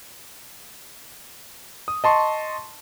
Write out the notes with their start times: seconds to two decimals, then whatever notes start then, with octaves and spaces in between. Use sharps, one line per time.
1.88 D#6
2.04 D#5 A5 C6 C#6